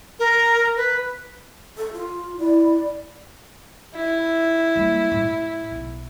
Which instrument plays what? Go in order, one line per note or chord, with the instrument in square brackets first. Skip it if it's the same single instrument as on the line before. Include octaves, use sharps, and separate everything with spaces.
[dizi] A#4
B4
[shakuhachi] A4
F4
[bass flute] E4 [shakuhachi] D5
[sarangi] E4
[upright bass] G3 A#3
A2
B1